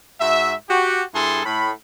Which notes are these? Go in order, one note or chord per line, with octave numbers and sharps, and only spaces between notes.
G#2 F#4 E5
F#4 G4
G2 E4 G#4 A4 C6
A2 B5